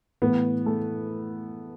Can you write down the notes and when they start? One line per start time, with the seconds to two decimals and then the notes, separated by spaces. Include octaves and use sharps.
0.22 A2 E3 B3
0.66 A3